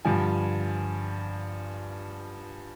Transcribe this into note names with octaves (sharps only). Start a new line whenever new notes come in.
G2 D3 F3 G#5